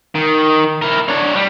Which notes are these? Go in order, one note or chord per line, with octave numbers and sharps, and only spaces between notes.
D#3
E4 A#4
D4 C#5
G3